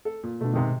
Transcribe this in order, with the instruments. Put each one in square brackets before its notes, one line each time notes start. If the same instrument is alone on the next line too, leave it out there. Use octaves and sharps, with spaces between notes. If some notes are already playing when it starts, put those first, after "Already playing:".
[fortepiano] A4
A#2
[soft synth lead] B2 [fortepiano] D3 A3
[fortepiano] G#2 C3 D#3